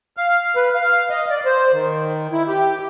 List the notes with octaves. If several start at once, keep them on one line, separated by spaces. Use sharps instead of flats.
F5
B4
F5
D#5
D5
C5
D#3
E4
G4